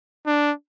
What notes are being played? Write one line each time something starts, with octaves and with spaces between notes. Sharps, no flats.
D4